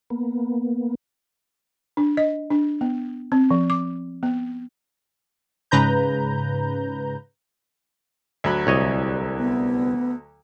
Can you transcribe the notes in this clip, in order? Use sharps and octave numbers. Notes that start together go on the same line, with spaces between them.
A#3 B3
D4
D#5
D4
B3
C4
F3
D6
B3
G#2 C#3 B4 A#5 G6
D2 F#3 B5
C2 C#5 D#5
B3